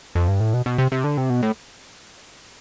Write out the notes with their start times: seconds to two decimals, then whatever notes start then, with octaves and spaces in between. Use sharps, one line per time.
0.15 F2
0.28 G2
0.40 A2
0.54 B2
0.66 B2
0.78 C3
0.92 C3
1.04 D3
1.17 C3
1.30 B2
1.42 A2